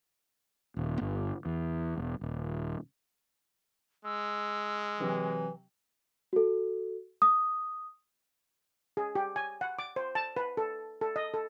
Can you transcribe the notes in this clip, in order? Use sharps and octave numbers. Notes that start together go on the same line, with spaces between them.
D#1
G1
E2
E1
D#1
G#3 E6
C3 E3 F#3 G4
F#4 A4
D#6
G#4
G4
G#5
F#5
D6
C5
A5
B4
A4
A4
D#5
A4